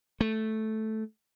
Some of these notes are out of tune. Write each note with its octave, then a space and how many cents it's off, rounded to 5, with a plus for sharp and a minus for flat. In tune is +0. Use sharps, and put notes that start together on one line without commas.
A3 -5